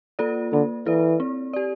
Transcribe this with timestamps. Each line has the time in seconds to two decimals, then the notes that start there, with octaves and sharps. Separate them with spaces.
0.19 A#3 F4 A4 D5
0.52 D3 A#3
0.86 E3 E4 A4 D5
1.20 C4
1.53 G4 D5